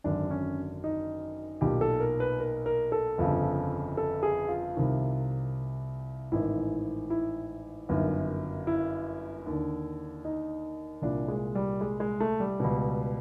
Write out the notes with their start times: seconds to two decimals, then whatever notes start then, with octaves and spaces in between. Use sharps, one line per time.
0.04 G#1 F#2 D3 D4
0.30 C#4
0.84 D#4
1.61 B1 A#2 G4
1.81 A4
2.00 A#4
2.20 B4
2.40 A#4
2.66 A#4
2.92 A4
3.18 G1 F2 C#3
3.97 A4
4.23 G#4
4.49 F4
4.76 C2 C3 D#3
6.32 A1 G#2 D#3 E4
7.10 E4
7.89 G1 F#2 D#3
8.67 E4
9.46 D#2 D3
10.25 D#4
11.02 C2 A#2 D4
11.28 G#3
11.55 G3
11.81 G#3
12.00 G#3
12.20 A3
12.40 G3
12.60 C#2 B2